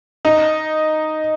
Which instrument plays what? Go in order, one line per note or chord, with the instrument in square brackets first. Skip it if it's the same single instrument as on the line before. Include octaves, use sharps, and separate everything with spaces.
[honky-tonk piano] D#4